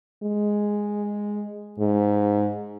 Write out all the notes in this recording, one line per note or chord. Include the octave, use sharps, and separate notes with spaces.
G#3
G#2